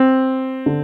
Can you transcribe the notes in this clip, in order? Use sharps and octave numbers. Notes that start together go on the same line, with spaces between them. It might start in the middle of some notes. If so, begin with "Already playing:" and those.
Already playing: C4
D3